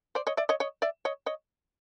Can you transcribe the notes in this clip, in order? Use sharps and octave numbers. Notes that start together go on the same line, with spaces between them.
C5 D5
C#5 D#5
D5 E5
C#5 D#5
C#5 D#5
D5 E5
C#5 D#5
C#5 D#5